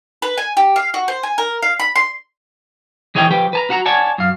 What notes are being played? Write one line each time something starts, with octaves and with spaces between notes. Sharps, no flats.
B4
G#5
G4
F5
F#4
C5
G#5
A#4
F5
B5
C6
E3 G#4 C#5 D#5 F#5 G5
F3 G4 B4 G5
B4 A5 A#5
F#4 F#5 A#5
C#5 D5 F#5 G#5 A5
F#2 F5